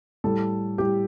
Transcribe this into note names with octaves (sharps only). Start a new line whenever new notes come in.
A2 G3 A4
A2 G3 G4